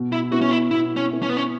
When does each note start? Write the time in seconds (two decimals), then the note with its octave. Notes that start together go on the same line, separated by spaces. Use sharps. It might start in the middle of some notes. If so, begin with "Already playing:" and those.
Already playing: B2
0.12 E4
0.31 B3 E4 F#4
0.41 C#4
0.51 E4
0.70 B2 E4
0.96 C#4
1.10 B3 E4
1.23 C#4
1.29 B3
1.37 C#4